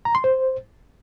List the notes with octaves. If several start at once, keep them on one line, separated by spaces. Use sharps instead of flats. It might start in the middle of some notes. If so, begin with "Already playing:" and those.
A#5
C6
C5